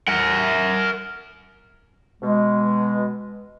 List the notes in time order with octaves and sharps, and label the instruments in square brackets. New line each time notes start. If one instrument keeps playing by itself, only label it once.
[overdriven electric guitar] A#4 F#5
[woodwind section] B2 G#3